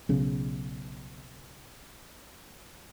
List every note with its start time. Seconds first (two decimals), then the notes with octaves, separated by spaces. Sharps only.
0.09 B1 C#3